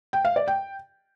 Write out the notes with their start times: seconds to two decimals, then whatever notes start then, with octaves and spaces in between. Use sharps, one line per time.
0.13 G5
0.25 F5
0.36 D5
0.48 G5